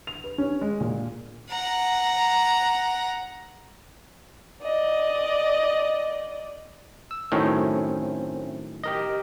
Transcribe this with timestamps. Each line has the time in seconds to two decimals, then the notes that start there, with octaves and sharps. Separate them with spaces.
0.07 F7
0.24 B4
0.38 C#4
0.61 G#3
0.81 A#2
1.50 F#5 A#5
4.63 D5 D#5
7.11 E6
7.32 F#2 A2 D#3 A3 C4 C#4
8.84 G4 A#4 D#5